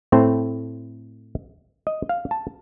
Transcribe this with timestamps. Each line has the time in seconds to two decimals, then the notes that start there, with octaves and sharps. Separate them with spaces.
0.12 A2 A3 C4 C5
1.87 D#5
2.09 F5
2.31 A5